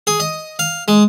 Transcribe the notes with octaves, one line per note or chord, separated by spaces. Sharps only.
G#4
D#5
F5
G#3